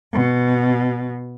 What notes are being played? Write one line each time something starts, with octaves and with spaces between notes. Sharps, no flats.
B2